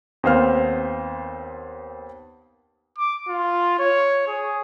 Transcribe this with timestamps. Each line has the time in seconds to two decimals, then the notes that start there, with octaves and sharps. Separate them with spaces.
0.23 D#2 B3 C4 C5 F5 F6
2.98 D6
3.28 F4
3.79 C#5
4.28 G#4